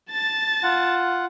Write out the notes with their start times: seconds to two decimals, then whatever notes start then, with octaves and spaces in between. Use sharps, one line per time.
0.11 A5 A6
0.63 F4 F#5